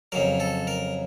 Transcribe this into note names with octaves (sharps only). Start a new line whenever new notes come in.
F2 C#3 F#3 A#4
A4
A#4